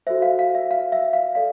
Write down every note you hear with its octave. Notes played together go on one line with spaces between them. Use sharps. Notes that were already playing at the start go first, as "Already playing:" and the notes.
F#4 A4 C5 E5
F5
F5
E5
F5
E5
F5
A4 D5 F5